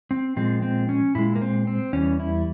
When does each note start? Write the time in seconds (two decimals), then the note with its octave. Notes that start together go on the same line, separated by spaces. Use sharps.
0.11 C4
0.36 A#2 F3 G#3 C4
0.62 C4
0.89 C#4
1.15 A#2 G#3 E4
1.35 A#3
1.41 C4
1.67 C4
1.93 E2 E3 G3 C#4
2.20 E4